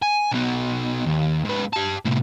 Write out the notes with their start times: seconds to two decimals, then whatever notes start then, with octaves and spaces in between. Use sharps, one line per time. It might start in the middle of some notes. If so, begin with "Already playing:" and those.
0.02 G#5
0.31 B1 B2
1.06 D#2
1.45 G#2 B4
1.73 G4 A5
2.05 A2 C3